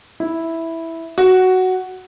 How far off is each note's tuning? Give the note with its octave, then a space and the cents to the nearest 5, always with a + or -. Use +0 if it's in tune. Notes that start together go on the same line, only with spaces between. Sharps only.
E4 -5
F#4 +5